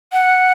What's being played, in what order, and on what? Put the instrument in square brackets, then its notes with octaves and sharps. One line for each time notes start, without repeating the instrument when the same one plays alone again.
[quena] F#5